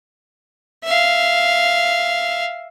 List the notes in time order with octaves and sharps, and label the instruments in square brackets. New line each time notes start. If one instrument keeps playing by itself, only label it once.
[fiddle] E5 F5